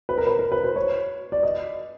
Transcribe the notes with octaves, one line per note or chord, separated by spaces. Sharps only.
B4
A#4
B4
A#4
B4
C5
C#5
D5
D#5